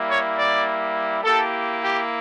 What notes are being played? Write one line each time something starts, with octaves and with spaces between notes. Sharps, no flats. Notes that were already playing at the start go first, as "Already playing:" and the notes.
Already playing: G3 A#3 E4
C#5
D5
A#3 E4 G4 A4
G4